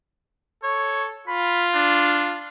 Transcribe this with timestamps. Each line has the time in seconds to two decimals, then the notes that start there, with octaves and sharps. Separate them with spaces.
0.64 A4 C#5
1.28 F4 B5
1.74 D4